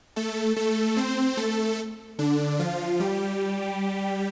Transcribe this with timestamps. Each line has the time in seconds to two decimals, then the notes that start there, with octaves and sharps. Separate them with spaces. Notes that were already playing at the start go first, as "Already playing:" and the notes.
0.16 A3 A4
0.56 A3 A4
0.97 C4 C5
1.37 A3 A4
2.19 D3 D4
2.59 F3 F4
3.00 G3 G4